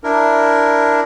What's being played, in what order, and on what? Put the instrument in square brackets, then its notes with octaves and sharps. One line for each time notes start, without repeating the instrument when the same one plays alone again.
[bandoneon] D4 E4 A#4